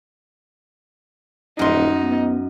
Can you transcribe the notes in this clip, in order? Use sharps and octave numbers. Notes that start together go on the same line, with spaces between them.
D#1 F#2 D#4 C6
B3